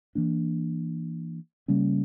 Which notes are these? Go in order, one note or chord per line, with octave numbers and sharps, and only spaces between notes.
E3 A#3 D4
C#3 G3 A#3 C#4